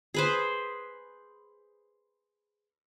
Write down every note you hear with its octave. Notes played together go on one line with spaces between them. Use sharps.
G#4 B4 C5